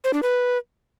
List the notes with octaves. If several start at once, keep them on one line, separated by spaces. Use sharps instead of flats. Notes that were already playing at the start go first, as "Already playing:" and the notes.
C5
D4
B4